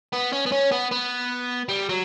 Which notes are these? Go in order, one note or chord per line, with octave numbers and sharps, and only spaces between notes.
B3
C#4
B3
C#4
B3
B3
G3
F#3